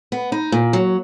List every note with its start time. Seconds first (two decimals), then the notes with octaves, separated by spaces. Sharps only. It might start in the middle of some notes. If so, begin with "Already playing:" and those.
0.12 B3
0.32 D#4
0.52 A#2
0.73 F#3